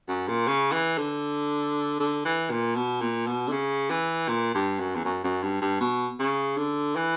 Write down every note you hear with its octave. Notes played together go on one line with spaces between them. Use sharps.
F#2
A#2
C#3
E3
D3
D3
E3
A#2
B2
A#2
B2
D3
C#3
E3
A#2
G2
F#2
E2
F#2
F#2
G2
G2
B2
C#3
D3
E3